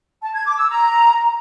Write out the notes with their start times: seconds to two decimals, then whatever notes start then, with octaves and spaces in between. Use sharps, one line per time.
0.22 A5
0.34 G#6
0.45 D6
0.57 E6
0.69 A#5